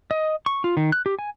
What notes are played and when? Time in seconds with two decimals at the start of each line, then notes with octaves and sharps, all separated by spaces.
0.11 D#5
0.46 C#6
0.64 F4
0.77 D#3
0.92 F#6
1.06 G4
1.19 G#5